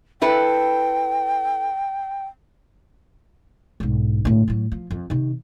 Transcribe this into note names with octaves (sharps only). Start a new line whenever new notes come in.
E4 A4 B4 G5
B1 G#2
A2 D3
A2 F#3
F3
F2
C3 D#3